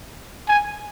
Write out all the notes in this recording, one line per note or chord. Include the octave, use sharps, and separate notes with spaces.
G#5